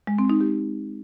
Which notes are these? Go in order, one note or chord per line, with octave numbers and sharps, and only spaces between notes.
G#3
C4
D#4
G4